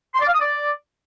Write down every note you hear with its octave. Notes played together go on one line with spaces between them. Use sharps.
C6
D5
F5
D#6
D5